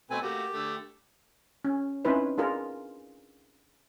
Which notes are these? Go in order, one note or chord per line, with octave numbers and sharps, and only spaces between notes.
B2 A3 C4 B4 G#5
A3 A#3 F#4 G4
D3 A3
C#4
C4 C#4 D#4 E4 B4 C5
D4 F4 G#4 A#4